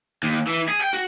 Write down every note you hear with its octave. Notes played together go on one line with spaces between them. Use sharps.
D#2
E3
G#4
G5
F#4